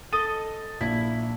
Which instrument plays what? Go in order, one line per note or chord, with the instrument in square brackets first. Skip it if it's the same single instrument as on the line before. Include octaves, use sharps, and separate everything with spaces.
[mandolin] A4 D#5 [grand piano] D#7
[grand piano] A#1 [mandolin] E4